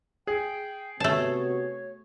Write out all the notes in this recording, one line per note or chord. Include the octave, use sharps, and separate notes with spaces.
G#4 G5
C3 A3 B3 F#4 C#5 A5